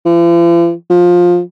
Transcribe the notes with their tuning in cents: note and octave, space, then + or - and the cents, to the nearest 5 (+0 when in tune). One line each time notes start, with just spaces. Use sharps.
F3 -45
F3 +15